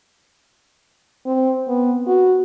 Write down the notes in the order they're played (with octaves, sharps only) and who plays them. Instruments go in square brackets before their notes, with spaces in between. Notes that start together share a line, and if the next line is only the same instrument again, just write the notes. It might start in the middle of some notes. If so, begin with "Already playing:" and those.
[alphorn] C4
B3
F#4